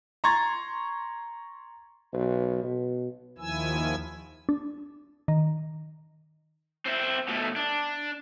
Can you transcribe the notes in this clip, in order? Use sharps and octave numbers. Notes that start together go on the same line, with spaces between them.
A#5 C6 C#6 G#6 A6
B1
B2
D#2 D#3 F3 E4 G#5 E6
D4
D#3
C4 E4
B2 A3
D4